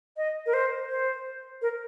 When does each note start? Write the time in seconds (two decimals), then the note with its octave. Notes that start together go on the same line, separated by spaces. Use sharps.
0.17 D#5
0.46 A#4
0.54 C5
0.90 C5
1.62 A#4